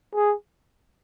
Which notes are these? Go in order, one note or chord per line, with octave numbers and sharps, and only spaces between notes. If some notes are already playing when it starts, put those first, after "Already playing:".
G#4